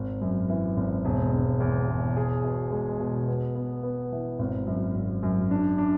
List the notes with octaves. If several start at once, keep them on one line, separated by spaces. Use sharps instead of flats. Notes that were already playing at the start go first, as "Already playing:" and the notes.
Already playing: G#1
F#2
E3
G#1
E1
E1
E2
E1
G#4
B2
G#3
B2
B3
B3
B3
E3
G#1
F#2
G#1
F#2
D4
D4